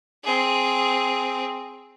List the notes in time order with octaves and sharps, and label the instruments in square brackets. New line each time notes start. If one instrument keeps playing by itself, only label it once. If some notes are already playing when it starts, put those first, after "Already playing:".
[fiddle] C4 G#4